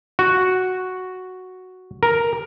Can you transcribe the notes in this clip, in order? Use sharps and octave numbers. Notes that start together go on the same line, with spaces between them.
F#4
A#4